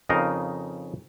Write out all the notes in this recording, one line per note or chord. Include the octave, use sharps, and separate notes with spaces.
F2 C#3 D#4 A#4 D#5 F5